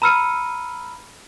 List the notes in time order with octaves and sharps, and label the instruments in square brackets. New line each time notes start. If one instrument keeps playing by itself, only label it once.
[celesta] A#5 B5 E6 F6 C#7 D#7